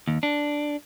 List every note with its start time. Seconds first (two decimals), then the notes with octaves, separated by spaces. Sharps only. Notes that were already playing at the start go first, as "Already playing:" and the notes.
0.08 D#2
0.23 D4